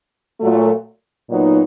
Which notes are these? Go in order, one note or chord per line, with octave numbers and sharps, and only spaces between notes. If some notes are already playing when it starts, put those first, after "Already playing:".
A#2 F#3 A3
A#2 F#3 B3 D#4